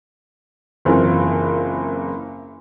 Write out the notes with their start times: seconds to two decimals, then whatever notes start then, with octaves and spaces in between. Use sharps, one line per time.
0.85 F#1 E3 C4 F4 A#4